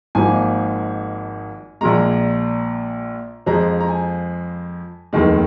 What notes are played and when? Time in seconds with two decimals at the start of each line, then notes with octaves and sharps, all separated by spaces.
0.15 G#1 G#2 F3 A#3 G#5
1.81 A#1 A#2 G#3 A#5
3.46 F2 F3 G#3 A#5
3.80 A#5
3.89 G#5
5.13 F1 D#2 D#3 G#3